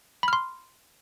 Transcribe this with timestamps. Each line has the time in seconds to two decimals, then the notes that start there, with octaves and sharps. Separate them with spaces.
0.23 B5
0.28 F6
0.33 C6